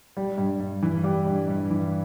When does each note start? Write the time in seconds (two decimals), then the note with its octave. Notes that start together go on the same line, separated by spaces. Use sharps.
0.17 G3
0.38 G2
0.60 G2
0.82 E3
1.04 G3 G4
1.26 G2
1.48 G2
1.70 E3